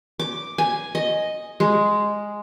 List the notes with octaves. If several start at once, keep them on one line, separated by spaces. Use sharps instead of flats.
D6
G#5
D#5
G#3